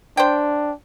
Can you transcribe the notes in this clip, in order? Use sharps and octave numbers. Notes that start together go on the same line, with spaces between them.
D4 C5 G5